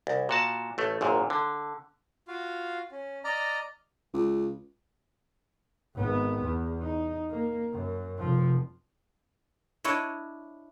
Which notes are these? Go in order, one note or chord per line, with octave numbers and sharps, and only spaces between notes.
C2
A#2 F#4 A5
A1 A3
G#1 F#2 A#2
D3
F4 F#4 F5
C#4
D5 D#5 A#5 F6
C#2
G#1 B3
E2
D#4
A#3
F#2
F1 F3
D4 E4 C#5 D#5